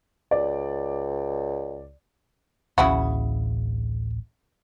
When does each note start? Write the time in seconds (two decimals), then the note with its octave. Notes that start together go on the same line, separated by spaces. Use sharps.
0.31 C#2 D5
2.78 D1 A1 C#3 E4 F#4